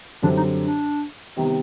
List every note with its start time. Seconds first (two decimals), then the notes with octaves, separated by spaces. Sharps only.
0.23 F#2 D3 G3 C4 D4
0.37 D#4
0.65 D4
1.37 C3 D#3 G3 B3